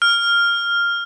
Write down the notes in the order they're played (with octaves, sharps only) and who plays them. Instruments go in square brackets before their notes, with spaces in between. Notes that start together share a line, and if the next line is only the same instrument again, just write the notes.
[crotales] F6